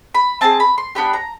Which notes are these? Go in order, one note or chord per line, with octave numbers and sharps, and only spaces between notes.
B5
C4 F4 G#4 A5
B5
C6
B3 D4 G4 B5
A#5